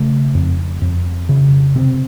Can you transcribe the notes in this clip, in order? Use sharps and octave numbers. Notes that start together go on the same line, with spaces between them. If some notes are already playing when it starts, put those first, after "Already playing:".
Already playing: C#3 A3
F2
F2
C#3
C3 C4